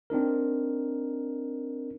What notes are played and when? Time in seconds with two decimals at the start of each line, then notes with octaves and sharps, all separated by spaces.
0.10 C4 D4 D#4 A#4